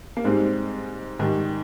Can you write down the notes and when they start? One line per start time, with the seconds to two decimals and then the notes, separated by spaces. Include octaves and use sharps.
0.17 A#3
0.24 G#2 G3 G#3 C4
1.19 G#2 D#3 G3